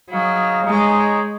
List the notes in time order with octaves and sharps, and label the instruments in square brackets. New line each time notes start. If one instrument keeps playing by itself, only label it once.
[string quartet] F#3 [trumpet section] D#4 G#4 C#5 F5
[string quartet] G#3 [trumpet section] D#4 G#4 C#5